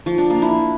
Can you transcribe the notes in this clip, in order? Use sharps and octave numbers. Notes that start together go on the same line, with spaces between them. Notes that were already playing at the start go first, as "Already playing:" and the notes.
F3
D4
A#3
E4